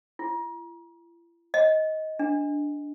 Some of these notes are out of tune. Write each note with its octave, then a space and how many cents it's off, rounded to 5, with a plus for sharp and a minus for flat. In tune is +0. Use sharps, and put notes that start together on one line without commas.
E4 +45
D#5 +15
D4 -5